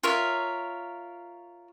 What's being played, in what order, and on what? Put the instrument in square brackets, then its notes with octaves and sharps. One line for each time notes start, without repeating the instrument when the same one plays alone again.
[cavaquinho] F4 A#4 C#5 E5